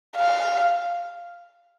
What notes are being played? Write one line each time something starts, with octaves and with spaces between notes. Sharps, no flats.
F5